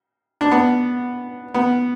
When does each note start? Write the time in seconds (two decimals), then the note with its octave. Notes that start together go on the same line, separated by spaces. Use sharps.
0.41 D4
0.51 B3
1.54 B3